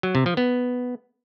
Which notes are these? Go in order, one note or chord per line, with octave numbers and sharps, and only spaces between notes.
F#3
C3
F3
B3